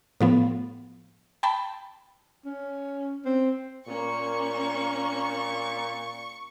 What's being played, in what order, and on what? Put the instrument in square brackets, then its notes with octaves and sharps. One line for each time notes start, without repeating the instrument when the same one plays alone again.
[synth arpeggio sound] A2 F3 B3
G5 A5 B5
[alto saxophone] C#4
C4
[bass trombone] A#2 [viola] A#3 C#4 [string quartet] C#6